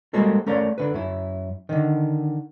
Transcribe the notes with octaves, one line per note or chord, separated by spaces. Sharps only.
G3 G#3 A#3 C4 F#4 A4
A3 C#4 A#4 D5 F5
D3 B4
F#2 E4
D3 D#3